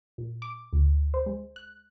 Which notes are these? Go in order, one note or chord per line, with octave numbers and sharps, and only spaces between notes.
A#2
D6
D2
C5
G#3
F#6